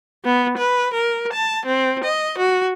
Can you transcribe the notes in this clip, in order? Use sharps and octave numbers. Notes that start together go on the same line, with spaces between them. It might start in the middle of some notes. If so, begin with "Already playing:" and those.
B3
B4
A#4
A5
C4
D#5
F#4